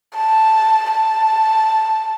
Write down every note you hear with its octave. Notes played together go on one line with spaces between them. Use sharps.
A5
A5